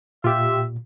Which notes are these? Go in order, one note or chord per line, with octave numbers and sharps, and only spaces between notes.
A#2 F4 G4 E5